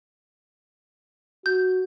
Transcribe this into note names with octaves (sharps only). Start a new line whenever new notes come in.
F#4 G6